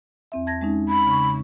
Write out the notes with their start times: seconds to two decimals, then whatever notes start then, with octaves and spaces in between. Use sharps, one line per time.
0.32 E2 C4 E5
0.47 A5 G#6 A#6
0.61 G#3 C#4 D#4
0.89 B5
1.06 C#3 C#6